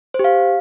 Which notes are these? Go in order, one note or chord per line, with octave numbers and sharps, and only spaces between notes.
C5
G4
F5